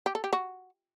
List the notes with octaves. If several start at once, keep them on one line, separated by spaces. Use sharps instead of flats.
G4
A4
G4
F#4